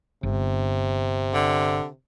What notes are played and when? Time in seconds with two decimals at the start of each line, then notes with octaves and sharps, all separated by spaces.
0.23 G1 C3
1.34 D3